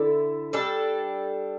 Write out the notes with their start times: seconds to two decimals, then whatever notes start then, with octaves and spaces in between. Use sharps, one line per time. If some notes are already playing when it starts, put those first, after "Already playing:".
Already playing: D3 E4 A4
0.53 G3 D4 A4